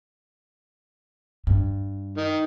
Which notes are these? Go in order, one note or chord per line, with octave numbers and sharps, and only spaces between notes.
G2
D#3